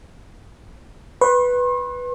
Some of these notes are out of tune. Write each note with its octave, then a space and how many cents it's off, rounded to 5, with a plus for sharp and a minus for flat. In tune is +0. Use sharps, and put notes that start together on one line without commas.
B4 +0 C6 +45